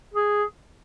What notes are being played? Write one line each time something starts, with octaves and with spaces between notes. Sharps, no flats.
G#4